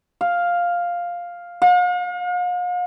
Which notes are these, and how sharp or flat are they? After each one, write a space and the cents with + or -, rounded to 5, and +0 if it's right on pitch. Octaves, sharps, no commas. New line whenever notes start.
F5 +5
F5 +45